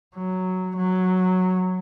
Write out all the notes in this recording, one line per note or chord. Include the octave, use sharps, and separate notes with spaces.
F#3
F#3